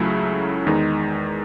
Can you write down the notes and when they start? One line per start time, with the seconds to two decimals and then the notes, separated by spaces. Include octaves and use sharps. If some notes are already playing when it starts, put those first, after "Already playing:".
Already playing: C#2 C#3 F#3 A3 E4
0.66 E2 D#3 G#3 D#4